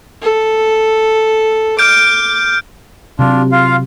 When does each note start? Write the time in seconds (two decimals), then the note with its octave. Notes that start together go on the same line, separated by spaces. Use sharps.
0.22 A4
1.79 D6 F6 G6 D7
3.19 C3 F#3 D4 F4
3.52 F4 F5